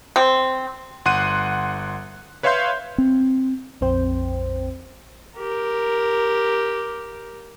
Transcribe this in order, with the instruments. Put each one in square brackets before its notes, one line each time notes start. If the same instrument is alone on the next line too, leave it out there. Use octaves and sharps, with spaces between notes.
[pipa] C4
[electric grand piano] G1 F#5 C6 F#6 D#7
B4 C#5 E5 F5 C6 G6
[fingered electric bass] C4
[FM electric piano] A#1 F2 C4 C5 G5
[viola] G4 A#4